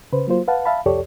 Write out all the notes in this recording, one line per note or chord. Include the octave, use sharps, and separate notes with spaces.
C#3 B4 C5
F#3 A#3 F4 C5
B4 F5 F#5 A5
E5 F5 A5 B5
C2 F2 G4 A4 C#5 D5